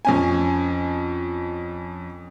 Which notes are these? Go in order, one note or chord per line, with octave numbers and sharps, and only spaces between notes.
F2 C#4 G#5